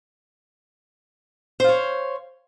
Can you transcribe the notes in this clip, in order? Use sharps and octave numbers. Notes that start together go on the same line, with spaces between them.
C5 C#5 F5